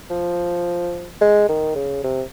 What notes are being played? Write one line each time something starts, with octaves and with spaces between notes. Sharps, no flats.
F3
G#3
D#3
C#3
C3